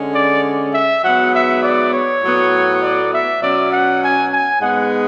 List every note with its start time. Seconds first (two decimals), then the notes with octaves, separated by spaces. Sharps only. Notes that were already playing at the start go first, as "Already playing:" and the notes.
Already playing: D3 G#3 C#4
0.13 D5
0.74 E5
1.03 G#2 F#3 B3 F#5
1.34 E5
1.63 D5
1.93 C#5
2.23 A2 F#3 B3
2.82 D5
3.13 E5
3.42 B2 F#3 C#4 D5
3.72 F#5
4.03 G#5
4.32 G#5
4.61 G#2 G#3 B3 F#5